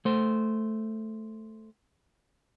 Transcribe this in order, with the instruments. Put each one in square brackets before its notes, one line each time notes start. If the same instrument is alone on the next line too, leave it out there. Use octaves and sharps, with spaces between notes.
[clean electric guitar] A3 C5